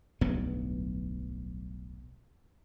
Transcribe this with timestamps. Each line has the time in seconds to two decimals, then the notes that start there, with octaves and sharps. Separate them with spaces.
0.21 D1 B1 G2 B3